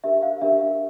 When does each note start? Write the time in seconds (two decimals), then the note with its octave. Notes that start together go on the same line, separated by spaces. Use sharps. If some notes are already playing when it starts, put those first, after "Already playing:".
0.04 D4 G4 A#4 E5
0.23 F5
0.41 D4 G4 A#4 E5